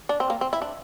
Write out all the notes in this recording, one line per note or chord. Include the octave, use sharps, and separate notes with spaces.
D4
C4
A#3
C4
E4
D4